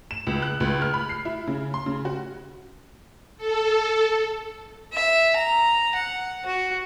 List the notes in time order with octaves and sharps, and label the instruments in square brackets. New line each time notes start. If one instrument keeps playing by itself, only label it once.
[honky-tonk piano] E7
C#2
F#6
C#2
F6
B5
C7
E4
C#3
C6
C#3
F#4
[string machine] A4
[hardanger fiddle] E5
A#5
F#5
F#4